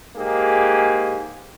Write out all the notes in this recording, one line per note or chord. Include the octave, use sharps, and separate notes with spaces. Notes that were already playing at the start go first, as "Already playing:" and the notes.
G#2 A#3 G4 G#4